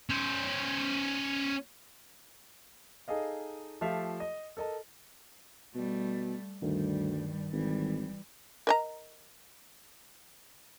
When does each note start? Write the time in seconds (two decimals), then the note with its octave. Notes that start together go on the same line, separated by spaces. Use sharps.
0.10 C#4 C5
3.08 D#4 G#4 A4 D#5 F5
3.81 F3 A3 F4 G4 E5 F5
4.20 D#5
4.57 A4 A#4 D#5 A5
5.75 B2 G3 A3
6.62 D2 G2 D#3 G3
7.53 G#1 E3 G3
8.67 A#4 D#5 A#5